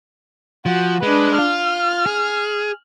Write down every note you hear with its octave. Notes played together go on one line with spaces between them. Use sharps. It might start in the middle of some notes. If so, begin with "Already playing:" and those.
F3 F#4
G#3 D4 B4
F4 F6
G#4